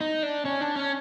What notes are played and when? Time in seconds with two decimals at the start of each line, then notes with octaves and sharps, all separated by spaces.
0.01 D#4
0.23 D4
0.45 C#4
0.61 D4
0.76 C#4